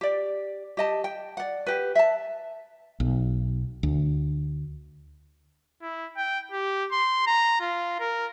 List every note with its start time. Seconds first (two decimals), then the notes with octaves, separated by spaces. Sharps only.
0.01 G4 D5
0.77 G4 D#5 A5
1.04 G5
1.37 D5 F#5
1.66 G4 B4
1.95 E5 A5
3.00 B1
3.83 D2
5.82 E4
6.17 G5
6.52 G4
6.92 C6
7.27 A#5
7.61 F4
8.01 A#4